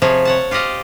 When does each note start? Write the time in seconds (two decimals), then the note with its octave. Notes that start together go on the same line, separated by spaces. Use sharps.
0.02 C3 F3 G#4 C#5
0.25 C#5 F#5 A5
0.51 F4 G4 D5 D#5 F5